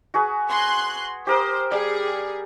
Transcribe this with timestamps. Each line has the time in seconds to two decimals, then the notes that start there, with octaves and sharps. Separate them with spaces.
0.14 F#4 G#4 B4
0.50 G#5 C6 F#6
1.27 G4 A#4 C5 D#6
1.71 G3 G#4